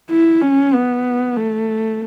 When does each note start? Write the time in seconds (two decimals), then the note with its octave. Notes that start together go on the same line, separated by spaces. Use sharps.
0.10 E4
0.42 C#4
0.73 B3
1.37 A3